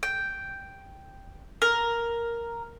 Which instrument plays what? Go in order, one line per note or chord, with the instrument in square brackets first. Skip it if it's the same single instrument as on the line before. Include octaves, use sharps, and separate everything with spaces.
[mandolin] G5
A#4